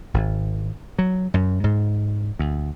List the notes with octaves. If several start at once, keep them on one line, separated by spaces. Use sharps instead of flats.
G#1
F#3
F#2
G#2
D2